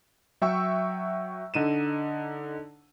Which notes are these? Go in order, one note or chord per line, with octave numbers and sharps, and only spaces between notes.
F#3 E5 G5 C#6 E6
D3 D#4 D#7 E7